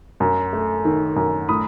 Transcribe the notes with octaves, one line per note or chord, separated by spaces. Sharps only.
F#2
A3
D#3
F#2
A2 B5 D#6